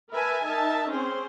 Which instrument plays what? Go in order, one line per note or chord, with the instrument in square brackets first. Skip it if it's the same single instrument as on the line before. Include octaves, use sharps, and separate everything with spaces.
[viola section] A#4 B4 E5 G#5 A5
D#4 A#4 E5 A5
C4 C#4 G#4 C5